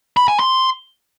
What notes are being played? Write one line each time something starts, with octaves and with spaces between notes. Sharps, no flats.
B5
G#5
C6